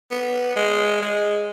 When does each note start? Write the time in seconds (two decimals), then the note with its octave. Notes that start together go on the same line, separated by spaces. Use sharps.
0.11 B3
0.56 G#3
1.01 G#3